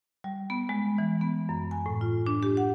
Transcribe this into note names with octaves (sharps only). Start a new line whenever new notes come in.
G3
B3
G#3
E3
B3
F#2
G#5
A2
F4
D4
G4
F#5